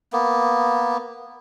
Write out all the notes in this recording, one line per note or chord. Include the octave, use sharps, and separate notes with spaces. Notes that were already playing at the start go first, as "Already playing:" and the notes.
A#3 B3